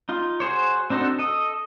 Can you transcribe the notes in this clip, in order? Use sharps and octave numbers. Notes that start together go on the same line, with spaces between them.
D#4 F4
F#4 G#4 C5 C#5
C4 D4 D#4 F#4 A4
A4 D#5